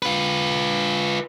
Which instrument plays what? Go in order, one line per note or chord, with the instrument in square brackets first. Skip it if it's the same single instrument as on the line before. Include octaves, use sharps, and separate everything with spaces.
[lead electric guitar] F4 B4